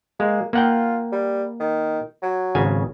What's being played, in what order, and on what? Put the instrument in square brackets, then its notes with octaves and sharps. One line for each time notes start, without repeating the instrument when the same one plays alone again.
[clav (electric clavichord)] G#3 [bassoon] A#3
[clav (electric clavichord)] A#3 F#5 G5 [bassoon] F4
[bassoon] G3
D#3
F#3
[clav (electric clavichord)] G#1 C#3 G#5